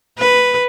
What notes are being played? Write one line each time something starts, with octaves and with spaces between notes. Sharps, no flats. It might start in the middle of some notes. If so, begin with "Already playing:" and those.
B4